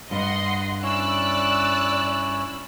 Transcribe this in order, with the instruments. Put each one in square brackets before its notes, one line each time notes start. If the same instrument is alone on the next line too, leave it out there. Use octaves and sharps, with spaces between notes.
[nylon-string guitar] G2 [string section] D#5 F#5 C6
[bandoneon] C#4 E4 C#5 [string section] D5 E6 F#6